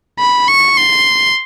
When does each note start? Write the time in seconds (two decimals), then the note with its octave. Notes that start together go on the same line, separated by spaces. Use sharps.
0.19 B5
0.48 C#6
0.77 C6